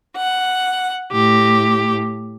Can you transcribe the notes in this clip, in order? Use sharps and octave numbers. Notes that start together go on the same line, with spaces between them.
F#5
A2 G4